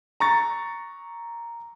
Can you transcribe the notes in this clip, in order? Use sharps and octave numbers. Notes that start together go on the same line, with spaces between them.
A#5 C#6 A6